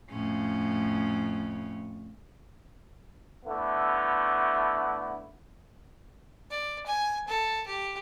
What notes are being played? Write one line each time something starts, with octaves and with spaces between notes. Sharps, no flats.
F2 A2 C#4
D3 A3 B3 E4
D5
G#5
A4
G4